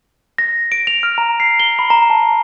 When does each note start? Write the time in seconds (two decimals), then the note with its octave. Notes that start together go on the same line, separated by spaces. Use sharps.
0.38 A#6
0.72 D7
0.87 F7
1.03 F6
1.18 A#5
1.40 C7
1.60 G7
1.79 B5
1.90 A#5
2.10 A5